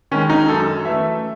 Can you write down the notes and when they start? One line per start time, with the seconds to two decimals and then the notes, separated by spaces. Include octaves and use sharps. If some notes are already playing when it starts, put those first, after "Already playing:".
0.11 D#3 G#3 C#4
0.30 D#4
0.48 F#2 A4
0.85 E3 A3 E5